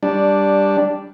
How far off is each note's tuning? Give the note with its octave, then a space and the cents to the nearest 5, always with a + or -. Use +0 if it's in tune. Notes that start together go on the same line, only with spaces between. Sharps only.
G3 +5 D4 +0